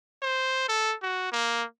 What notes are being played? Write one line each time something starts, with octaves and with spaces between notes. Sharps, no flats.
C5
A4
F#4
A#3